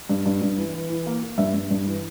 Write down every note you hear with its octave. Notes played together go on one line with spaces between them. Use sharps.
G2
G2
G2
E3
E3
E3
A#3
A#3
G2 E5
G2
G2
E3